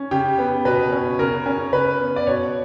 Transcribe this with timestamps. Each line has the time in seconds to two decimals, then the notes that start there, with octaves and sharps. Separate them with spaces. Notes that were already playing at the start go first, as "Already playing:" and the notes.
Already playing: C#4
0.11 C#3 G4
0.38 B3
0.65 B2 B4
0.92 C#4
1.19 C#3 A#4
1.46 C#4
1.73 C#3 B4
2.00 B3
2.16 D5
2.27 B2 C#5